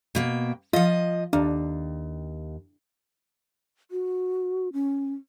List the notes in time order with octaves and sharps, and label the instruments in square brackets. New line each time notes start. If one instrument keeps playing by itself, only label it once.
[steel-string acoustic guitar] B2 A#3 G5
[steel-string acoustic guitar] F3 D#5 [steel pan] F4
[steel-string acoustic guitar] D#2 [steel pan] D4
[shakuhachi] F#4
C#4